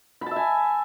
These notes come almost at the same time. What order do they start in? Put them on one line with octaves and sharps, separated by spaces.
B5 A5 E5 G#5